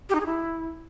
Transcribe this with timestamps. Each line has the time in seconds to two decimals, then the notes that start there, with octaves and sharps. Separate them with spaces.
0.09 G4
0.15 D#4
0.20 G#4
0.26 E4